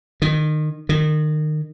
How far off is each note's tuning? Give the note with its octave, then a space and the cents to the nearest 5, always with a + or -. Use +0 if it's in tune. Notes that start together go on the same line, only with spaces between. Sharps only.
D#3 -25
D#3 -30